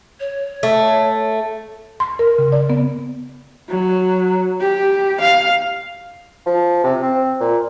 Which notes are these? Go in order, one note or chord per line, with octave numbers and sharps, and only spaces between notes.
C#5
A3
C6
A#4
C#3
D5
B3
F#3
G4
F5
F3
C3
C4
A#2